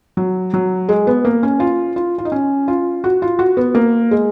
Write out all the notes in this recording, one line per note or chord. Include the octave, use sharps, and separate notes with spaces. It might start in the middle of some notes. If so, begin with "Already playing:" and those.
F#3
F#3
G#3
B3
A#3
C#4
F4
F4
F4
D#4
C#4
F4
F#4
F4
F#4
B3
A#3
G#3